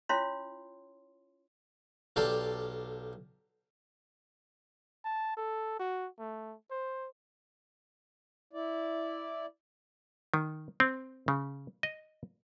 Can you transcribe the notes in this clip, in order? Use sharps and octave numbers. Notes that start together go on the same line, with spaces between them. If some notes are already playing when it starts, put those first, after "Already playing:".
C#4 E4 F4 C#5 F5 C6
B1 G4 A4 D5 F5 A5
A5
A4
F#4
A3
C5
E4 D5
D#3
C4
C#3
D#5